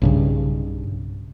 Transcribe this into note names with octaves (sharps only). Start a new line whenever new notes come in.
B1 G2 C#3